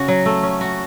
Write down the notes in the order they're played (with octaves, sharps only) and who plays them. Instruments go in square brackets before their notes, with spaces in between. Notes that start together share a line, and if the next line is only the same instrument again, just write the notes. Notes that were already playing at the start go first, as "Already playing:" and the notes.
Already playing: [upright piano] C#3 [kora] C#4 F#4
[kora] F#3
A3
C#4
F#4